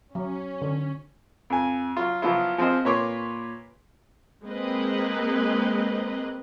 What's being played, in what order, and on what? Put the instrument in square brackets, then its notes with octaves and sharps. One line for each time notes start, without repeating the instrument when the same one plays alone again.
[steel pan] F#3 [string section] C#4
[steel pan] D3
[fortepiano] F2 G#5
F#3 F4
F3 F#3 B3 E4 F4
F3 C4 G#4 C5 D#5
A#2 B4 C#5 C6 D6
[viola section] G#3 A#3 C4 B4 D#5